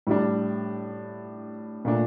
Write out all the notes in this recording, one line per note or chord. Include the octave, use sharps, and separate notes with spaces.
A2 G3 D4
A#2 A3 D4